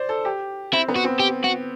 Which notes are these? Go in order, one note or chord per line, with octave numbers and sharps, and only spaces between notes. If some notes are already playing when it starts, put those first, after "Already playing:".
Already playing: C5 D5
A4
G4
C4 E4
B3
F#4
C4
G4
F#4